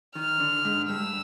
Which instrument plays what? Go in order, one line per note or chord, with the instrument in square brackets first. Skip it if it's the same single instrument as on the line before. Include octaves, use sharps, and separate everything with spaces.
[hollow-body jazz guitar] D#3 [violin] F6
[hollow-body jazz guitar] D3
G#2
[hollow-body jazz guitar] G2 [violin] E6